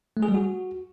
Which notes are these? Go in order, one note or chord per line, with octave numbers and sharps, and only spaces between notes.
A3
G#4
G3
F#4